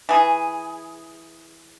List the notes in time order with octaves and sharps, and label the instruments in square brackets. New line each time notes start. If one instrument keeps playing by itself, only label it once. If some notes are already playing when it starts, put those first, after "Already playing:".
[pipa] E3 G#4